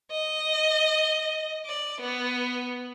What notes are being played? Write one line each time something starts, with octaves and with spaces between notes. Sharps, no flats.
D#5
D5
B3